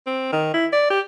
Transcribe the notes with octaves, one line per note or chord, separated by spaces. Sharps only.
C4
D#3
E4
D5
G4